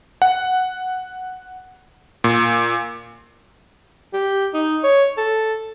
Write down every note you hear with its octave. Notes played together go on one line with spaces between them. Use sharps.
F#5
A#2
G4
D#4
C#5
A4